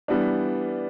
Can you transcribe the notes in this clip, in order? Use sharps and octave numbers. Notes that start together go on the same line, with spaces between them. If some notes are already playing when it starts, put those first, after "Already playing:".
E3 G3 B3 D4